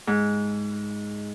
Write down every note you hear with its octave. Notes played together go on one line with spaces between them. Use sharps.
G#2